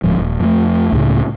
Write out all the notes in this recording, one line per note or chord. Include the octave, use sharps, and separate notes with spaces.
D1 G#2 F3
D#1
F2 G#3 A3
C#2 A2 C#3